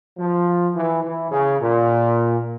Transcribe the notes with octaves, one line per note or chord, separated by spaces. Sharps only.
F3
E3
E3
C#3
A#2